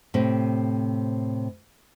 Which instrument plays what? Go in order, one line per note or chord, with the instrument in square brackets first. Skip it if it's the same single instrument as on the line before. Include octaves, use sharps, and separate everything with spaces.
[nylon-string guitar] A2 C3 C4